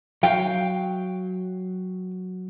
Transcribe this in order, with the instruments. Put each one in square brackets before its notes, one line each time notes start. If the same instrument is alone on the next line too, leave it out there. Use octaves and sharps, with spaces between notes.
[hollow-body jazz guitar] F#3 [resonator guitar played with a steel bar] F5 G5